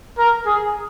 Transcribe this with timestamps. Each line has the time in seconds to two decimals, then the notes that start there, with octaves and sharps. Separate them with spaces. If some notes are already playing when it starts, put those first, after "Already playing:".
0.18 A#4
0.46 G#4